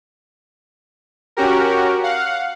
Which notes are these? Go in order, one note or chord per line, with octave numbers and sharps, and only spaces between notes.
C#4 F#4 G4 A#4
F5 F#5